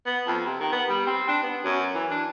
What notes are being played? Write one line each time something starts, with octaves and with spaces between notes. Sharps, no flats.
B3
F2
C3
D#3
B3
G3
C4
D4
B3
F#2
E3
D4